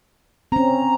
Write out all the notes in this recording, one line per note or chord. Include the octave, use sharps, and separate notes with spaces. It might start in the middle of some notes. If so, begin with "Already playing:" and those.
C4 C#4 A#5